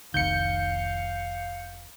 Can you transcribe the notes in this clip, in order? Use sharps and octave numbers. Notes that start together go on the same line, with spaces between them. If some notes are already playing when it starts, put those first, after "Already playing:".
F1 C2 D#3 F5 G6 C#7